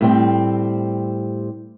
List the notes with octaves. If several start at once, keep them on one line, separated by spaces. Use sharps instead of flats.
A2 G3 C4